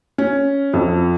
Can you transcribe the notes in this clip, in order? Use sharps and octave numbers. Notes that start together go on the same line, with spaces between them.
C#4
F2